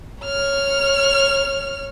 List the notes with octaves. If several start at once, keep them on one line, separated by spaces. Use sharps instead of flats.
C#5 F6